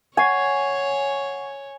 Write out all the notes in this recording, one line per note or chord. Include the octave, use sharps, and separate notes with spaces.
C#5 F#5 G#5 C#6 C7